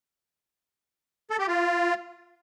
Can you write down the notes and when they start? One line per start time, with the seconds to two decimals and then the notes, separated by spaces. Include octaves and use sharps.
1.30 A4
1.39 G4
1.48 F4